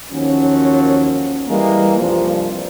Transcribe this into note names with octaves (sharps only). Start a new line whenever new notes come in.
D#2 D#3 F3 F#3 C#4
E3 G3 G#3 A#3
C2 G2 F3